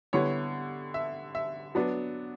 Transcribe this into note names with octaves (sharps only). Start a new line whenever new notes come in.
D3 G3 B3 E4 C#5
E5
E5
F#3 B3 D4